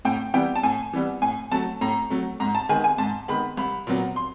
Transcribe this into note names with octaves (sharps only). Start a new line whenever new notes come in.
A2 G5
E3 G3 B3 G5
A5
A2 G#5
E3 G3 B3
A2 G#5
F#3 A3 A5
A2 A#5
F#3 A3
G#2 A#5
A5
D#3 G#3 B3 G#5
G#5
G#2 A5
D#3 G#3 B3 B5
C2 B5
A#2 F#3 B3
C6